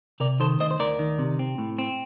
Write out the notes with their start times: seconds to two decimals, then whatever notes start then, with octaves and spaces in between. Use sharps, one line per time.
0.20 C3 A#4 D5
0.40 D#3 A4 C5
0.60 D2 C5 D#5
0.71 C5
0.79 D2 A#4 D5
0.99 D#3
1.19 C3
1.39 C4
1.58 A2
1.79 C4